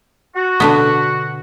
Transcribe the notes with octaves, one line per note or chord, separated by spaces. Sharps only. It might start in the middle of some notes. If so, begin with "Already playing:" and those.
F#4
B2 D3 B3